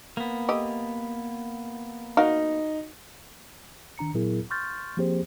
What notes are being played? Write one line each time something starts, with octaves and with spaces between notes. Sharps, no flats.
A#3 B3
A3 G4 D#5
D#4 F#4 A#4 F5
D#3 D4 A#5 C#7
A#2 F#3 B3 E4 G#4 A#4
C6 C#6 F6 G6 A6
F3 A#3 C4 G4 G#4 C5